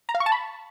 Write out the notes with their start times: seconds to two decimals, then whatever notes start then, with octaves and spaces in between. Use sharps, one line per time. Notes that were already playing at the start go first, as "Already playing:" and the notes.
0.09 A#5
0.15 F5
0.20 C#6
0.26 A5
0.32 B5